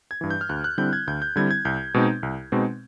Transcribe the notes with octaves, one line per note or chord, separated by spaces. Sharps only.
G#6
G2 E3
G6
F6
D2 F#6
F#6
D3 G3 C4 E4 G6
G#6
D2 G6
G6
D3 G3 C4 E4 G#6
G#6
C2 G6
B2 G#3 C4 D#4
C2
B2 G#3 C4 D#4